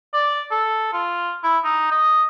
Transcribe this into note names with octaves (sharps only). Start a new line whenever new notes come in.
D5
A4
F4
E4
D#4
D#5